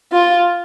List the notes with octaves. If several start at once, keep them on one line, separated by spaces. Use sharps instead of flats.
F4